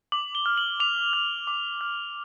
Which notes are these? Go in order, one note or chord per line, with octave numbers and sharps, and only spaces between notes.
D6 F#7
G7
F6
F#7
D6 F7
F6
D6
F6